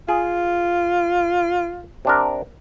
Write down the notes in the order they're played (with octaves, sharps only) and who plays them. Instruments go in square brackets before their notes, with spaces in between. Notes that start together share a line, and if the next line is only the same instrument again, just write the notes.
[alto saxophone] F4 [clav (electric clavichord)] G#4
[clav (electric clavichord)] C3 D4 A#4